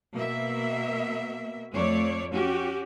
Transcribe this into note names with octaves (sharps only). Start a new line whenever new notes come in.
B2 A#3 E5
F2 A3 C#5 D5
C#4 F#4 G4